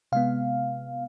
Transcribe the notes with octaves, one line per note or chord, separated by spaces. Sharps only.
C3 G#3 B3 F5